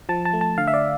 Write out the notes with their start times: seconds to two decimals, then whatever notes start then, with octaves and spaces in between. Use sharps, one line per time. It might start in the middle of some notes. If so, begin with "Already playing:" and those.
0.09 F3 A5
0.25 A5
0.33 A3
0.41 A5
0.58 D3 F5
0.67 E5
0.74 D5